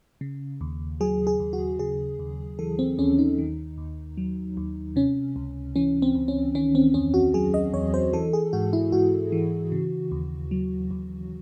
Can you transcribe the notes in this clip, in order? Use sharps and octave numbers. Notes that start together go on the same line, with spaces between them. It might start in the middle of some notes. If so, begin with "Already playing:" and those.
C#3
D#2
F#3 G#4
G#4
D#2
F#4
C#3 G#4
D#2
E3 A4
C4
D#2 C#4
D#4
D#3
D#2
F#3
D#2
C3 C#4
C#2
E3 C#4
C4
C#2
C#4
D#3 C#4
C4
E2 C#4
F#4
F#3 G#4
D#5
E2 C#5
C5
E3 A4
G#4
G#2 F#4
E4
G#2 F#4
E3
C#3
D#2
F#3
D#2